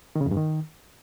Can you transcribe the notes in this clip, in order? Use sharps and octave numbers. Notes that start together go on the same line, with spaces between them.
D#3
C#3
F2
G2
D#3